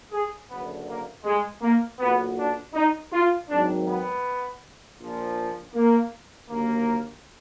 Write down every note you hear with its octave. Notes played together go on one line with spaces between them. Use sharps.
G#4
F#1 F#2 D3 B3
A#3
G#3
A#3
B1 A#2 F#3 B3
D4
D#4
F4
G#1 G#2 D#3 F#3 D4
B3
A#1 A#2 F3
A#3
D#2 D3 F#3 A#3